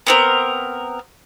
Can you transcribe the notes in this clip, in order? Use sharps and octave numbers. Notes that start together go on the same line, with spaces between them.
B3 C4 A#4